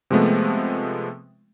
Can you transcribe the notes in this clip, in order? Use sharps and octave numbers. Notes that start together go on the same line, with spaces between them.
C3 F3 G#3 A3 B3